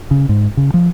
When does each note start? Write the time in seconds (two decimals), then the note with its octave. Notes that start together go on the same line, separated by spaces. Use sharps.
0.11 C#3
0.29 G#2
0.57 C#3
0.74 F3